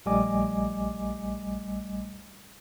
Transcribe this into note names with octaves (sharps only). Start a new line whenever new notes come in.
A#1 G3 A3 D#5 G#5 D6